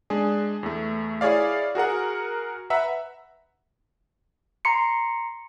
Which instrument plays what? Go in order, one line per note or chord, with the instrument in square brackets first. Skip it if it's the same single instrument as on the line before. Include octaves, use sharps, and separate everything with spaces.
[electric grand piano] G#3 D4 G#4
E2 A3
E4 G#4 C#5 D5 F5
F#4 G#4 A#4 F#5
B4 E5 F#5 A#5 E6
[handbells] A#5 C6 C#7